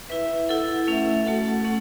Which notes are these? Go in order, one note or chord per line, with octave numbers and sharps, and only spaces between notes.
E4 B4 E5
E4 A4 F#5
A3 C#4 A4 E5
A3 F#4 A4 F#5
A3 C#4 A4 F#5